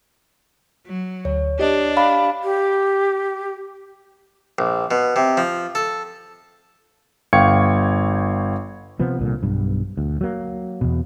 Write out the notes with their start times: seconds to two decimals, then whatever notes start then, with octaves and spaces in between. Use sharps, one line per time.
0.86 F#3
1.25 D2 C#5
1.59 D4 G4 D#5
1.97 F5 B5
2.44 G4
4.59 A#1
4.91 B2
5.16 C3
5.37 F3
5.75 A4
7.33 G1 F5 G5 C#6 G#6 C#7
9.00 C3 F3 B3
9.19 C2 A#2 D3
9.43 B1 G2
9.97 D2
10.21 F#3 A#3
10.81 E2 B2